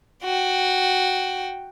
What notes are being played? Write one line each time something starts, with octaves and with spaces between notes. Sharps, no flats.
F#4 G5